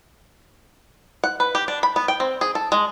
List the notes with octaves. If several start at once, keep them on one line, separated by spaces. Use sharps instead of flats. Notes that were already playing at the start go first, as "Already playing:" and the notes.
F#5
B4
G4
D4
B5
B3
G5
C4
G#4
A4
G#3